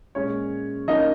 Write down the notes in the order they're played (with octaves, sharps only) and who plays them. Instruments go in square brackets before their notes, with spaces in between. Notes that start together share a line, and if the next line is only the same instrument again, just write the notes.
[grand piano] A#2 G#3 C#4 C#5
F3 A#3 C#4 D#4 D#5